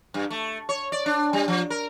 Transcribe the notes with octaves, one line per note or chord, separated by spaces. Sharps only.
G2
A3
C#5
D5
D4
G3
F3
A#4